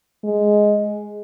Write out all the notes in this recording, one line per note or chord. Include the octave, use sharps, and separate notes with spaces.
G#3